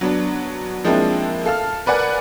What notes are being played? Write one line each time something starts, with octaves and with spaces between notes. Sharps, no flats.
F#3 B3 D4
F3 G#3 A#3 C4 D4 E4
A4 F5 A5 F6
A#4 B4 D5 F#5 G#5